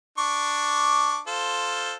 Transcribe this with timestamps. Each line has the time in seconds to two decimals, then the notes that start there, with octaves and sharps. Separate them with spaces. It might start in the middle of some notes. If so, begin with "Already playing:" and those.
0.18 D4 C#6 D6
1.27 F4 A4 C5